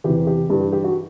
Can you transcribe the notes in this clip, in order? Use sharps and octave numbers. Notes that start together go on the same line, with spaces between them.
E2 C3 E3 G4
G4
G2 E3 G4
G4
G4
F#4